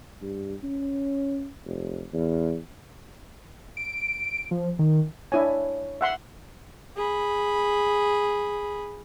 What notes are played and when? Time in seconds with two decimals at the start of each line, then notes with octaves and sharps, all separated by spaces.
0.22 G2
0.64 C#4
1.66 F1
2.13 E2
3.77 D7
4.51 F3
4.79 D#3
5.32 D4 E4 C#5 G#5
6.01 E5 F#5 C6
6.97 G#4 B5